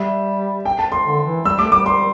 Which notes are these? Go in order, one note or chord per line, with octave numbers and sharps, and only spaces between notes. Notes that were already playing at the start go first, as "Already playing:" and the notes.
Already playing: G3 E5
G5
A5
C6
D3
E3
G3 E6
A3 D6
G3 D6
C6